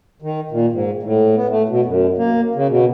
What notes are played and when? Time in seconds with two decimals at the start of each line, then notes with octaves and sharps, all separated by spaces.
0.22 D#3
0.51 A#2
0.72 G#2
1.03 A2
1.36 B3
1.50 A3
1.69 B2
1.85 F#2
2.18 A#3
2.55 C#3
2.69 B2